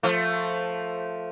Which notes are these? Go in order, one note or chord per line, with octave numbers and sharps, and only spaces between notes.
F3 A3